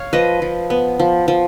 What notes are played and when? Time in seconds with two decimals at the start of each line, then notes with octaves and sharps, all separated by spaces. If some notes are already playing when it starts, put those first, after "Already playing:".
Already playing: C#5 F5
0.13 F3 B4 D#5
0.42 F3
0.70 B3
0.99 F3
1.28 F3